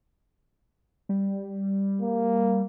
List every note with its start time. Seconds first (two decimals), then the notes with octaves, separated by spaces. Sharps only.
1.09 G3
2.02 A#3